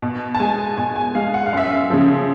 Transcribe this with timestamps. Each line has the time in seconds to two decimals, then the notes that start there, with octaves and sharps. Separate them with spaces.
0.02 B2
0.35 A5
0.40 G#3 G#5
0.77 B2 G#5
0.96 G#5
1.15 G#3 F5
1.34 F#5
1.46 F5
1.53 F#2 E5
1.69 F5
1.90 C#3 F3